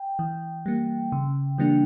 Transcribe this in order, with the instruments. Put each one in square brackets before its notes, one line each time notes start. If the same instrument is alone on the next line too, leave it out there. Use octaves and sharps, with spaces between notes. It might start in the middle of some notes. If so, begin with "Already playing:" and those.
Already playing: [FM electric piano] G5
E3
G3 A#3
C#3
E3 G3 A#3 D4